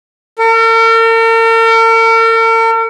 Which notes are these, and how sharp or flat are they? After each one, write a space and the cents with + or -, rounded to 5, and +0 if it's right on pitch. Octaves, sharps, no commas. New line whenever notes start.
A#4 -45